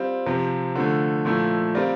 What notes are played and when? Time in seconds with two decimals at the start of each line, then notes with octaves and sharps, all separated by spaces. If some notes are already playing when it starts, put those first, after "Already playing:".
Already playing: G3 C4 F4
0.26 C3 F3 C4 G4
0.76 D3 F3 A3
1.25 A#2 F3 A3 E4
1.75 G3 C4 F4 A#4 D5